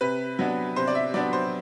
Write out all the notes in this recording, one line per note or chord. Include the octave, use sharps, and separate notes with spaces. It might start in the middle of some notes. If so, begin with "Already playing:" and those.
C3 B4
F#3 B3 D4
C3 C5
D5
E5
F#3 B3 D4 D5
C5